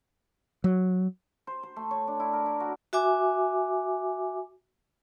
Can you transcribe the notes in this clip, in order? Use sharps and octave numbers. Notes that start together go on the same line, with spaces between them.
F#3
C5
C5
A3
C#5
D4
E4
A#4
E4
F#4
F#4 E5 G#5 D6